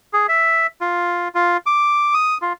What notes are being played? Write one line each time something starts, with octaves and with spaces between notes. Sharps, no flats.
G#4
E5
F4
F4
D6
D#6
F4